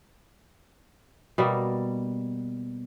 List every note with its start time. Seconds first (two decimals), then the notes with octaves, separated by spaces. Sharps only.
1.38 B2 G3 A#3